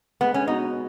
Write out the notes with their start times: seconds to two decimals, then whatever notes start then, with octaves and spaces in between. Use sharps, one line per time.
0.21 G#3 B3
0.34 C#4
0.47 B3 D#4 F#4